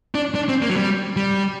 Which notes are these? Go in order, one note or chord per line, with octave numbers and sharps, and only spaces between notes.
D4
D4
C4
A#3
F#3
G3
G3